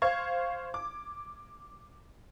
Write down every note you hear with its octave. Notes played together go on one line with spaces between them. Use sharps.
C5 F5 C#6 G#6
D6